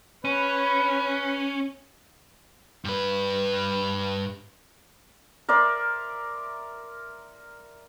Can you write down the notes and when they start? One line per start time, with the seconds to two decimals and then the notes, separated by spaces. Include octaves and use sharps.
0.25 C#4 B4
2.85 G2 B4
5.49 A#4 D5 E5 C6